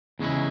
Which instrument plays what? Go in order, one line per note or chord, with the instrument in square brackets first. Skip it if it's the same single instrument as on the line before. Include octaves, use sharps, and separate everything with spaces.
[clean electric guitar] E2 C#3 G#3 C#4 E4